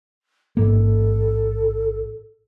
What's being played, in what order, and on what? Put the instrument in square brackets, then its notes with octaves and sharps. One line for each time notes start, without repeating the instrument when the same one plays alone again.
[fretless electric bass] A1 G#2 A#3 [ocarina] A4